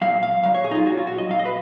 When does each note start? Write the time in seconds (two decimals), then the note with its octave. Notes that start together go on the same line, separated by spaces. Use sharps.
0.01 A#2 F#3 F5
0.23 F5
0.43 A#2 F#3 F5
0.54 C#5
0.64 G#4
0.71 D#4
0.75 F4
0.86 A#2 F#3 F#4
0.97 F4
1.07 F#4
1.18 D#5
1.29 A#2 F#3 F5
1.39 D#5
1.45 B4